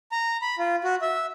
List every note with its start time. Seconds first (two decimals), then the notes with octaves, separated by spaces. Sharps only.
0.12 A#5
0.42 B5
0.59 F4
0.84 F#4
1.01 E5